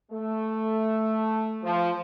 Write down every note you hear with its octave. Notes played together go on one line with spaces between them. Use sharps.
A3
F3